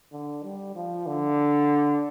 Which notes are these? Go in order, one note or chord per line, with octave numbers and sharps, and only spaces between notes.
D3
G3
F3
D3